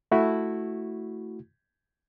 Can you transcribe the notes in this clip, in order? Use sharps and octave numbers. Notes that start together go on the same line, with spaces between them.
A3 E4 F#4